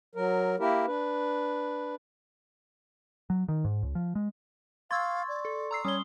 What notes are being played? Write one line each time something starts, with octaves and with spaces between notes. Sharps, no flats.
F#3 A#4
A#3 E4 G4 A#4
D4 B4
F#3
D#3
G#2
C#2
F3
G#3
F5 C6 C#6 E6 G#6 A6
D5
A4
A#5 E6 C7
G3 C#4 C#5 D#6 G7